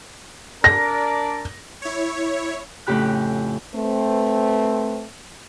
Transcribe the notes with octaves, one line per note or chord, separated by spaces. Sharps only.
D4 A#4 D5 A#6
E4 C#5
F2 A2 C#3 G4 B5 F#6
A3 C4 B4